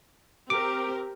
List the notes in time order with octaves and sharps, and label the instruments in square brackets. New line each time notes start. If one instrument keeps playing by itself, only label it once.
[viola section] C4 G4 A#4 [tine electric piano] D6